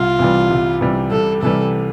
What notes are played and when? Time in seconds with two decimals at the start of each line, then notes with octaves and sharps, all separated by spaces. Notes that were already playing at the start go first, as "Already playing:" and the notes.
Already playing: C2 F4
0.19 C3 E3 G3
0.51 C2
0.81 C3 E3 G3
1.11 C2 A4
1.42 C3 E3 G3 A4